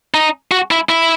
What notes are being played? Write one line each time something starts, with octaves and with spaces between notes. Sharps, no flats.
D#4
F#4
E4
E4